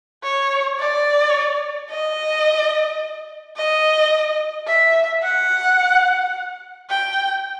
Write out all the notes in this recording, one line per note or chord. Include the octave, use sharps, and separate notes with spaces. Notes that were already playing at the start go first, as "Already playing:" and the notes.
C#5
D5
D#5
D#5
E5
F#5
G5